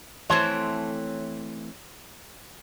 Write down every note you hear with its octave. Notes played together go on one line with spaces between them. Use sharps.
E3 A3 C4 C#5 A5 C6